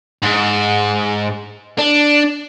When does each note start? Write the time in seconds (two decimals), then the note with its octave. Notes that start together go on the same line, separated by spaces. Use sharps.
0.23 G#2
1.79 D4